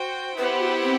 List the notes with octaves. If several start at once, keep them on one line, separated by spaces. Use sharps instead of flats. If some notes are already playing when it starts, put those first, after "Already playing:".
Already playing: F#4 C5 G5
B3 E4 G4 B4 C5 F#5
F#4
C4